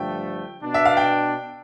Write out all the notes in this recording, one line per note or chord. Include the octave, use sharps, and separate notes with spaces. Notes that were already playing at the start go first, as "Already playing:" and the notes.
Already playing: G2 D3 F3 A3 G5
B2 B3 D4
E5
F5
G5